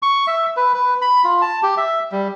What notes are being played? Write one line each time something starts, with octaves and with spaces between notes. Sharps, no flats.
C#6
E5
B4
B4
B5
F4
A5
G4
E5
G3